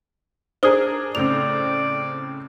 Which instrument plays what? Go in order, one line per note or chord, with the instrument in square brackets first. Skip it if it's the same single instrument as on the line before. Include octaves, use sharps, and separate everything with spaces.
[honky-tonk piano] D4 G#4 A#4 [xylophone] C5 D#6
[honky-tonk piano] A2 C#3 C4 [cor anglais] D5 [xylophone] F7